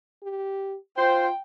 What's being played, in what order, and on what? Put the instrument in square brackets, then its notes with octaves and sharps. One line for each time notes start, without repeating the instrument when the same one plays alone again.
[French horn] G4
[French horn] F4 [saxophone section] C5 [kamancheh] G5